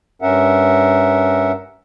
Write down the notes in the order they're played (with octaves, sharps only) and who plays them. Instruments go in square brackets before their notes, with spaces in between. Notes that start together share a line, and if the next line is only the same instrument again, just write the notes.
[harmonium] G2 C#4 A#4 E5 F#5